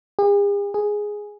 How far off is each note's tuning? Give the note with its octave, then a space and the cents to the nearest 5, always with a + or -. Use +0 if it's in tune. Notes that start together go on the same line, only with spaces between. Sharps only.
G#4 -45
G#4 +0